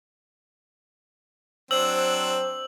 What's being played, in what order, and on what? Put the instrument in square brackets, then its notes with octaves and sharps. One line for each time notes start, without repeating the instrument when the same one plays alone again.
[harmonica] F#3 C4 D4 [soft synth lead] C5 [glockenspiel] E6 [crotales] F#7